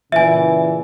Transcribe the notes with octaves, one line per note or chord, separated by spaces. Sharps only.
A#2 C#3 E3 E5 G#5